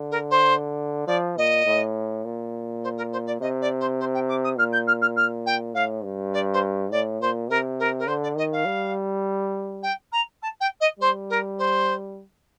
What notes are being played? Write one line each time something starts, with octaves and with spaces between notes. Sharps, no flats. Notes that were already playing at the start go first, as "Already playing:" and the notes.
Already playing: D3
A#4
C5
F3 D5
A#2 D#5
A2
A#2
C5
A#4
C5
D5
C3 D#5
D5
C5
C5
G5
D6
D#6
A#2 F6
G6
F6
F6
F6
G5
A2 F5
G2
D5
C5
A2 D5
A#2 C5
C3 A#4
A#4
A#4
D3 C5
D5
D#3 D#5
F5
G3
G5
A#5
A5
G5
D#5
G3 C5
A#4
C5